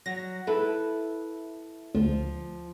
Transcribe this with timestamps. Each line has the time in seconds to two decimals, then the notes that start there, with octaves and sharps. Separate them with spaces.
0.06 F#3 A#6
0.47 E4 A4 B4
1.95 D2 F3